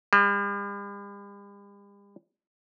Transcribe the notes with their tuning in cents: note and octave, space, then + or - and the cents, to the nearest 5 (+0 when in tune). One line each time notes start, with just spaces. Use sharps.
G3 +45